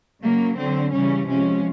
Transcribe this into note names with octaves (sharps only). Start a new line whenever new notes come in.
C#3 F#3 A#3
D3 F#3 C4
C#3 E3 G3 C#4
C3 F3 G#3 C#4